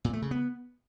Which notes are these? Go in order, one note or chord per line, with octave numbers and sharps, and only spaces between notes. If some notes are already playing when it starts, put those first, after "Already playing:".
A#2
A3
C#3
B3